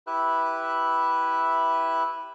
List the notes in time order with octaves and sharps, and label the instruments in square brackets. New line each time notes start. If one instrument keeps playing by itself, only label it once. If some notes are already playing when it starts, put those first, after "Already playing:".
[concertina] E4 G4 B4 E5 F#6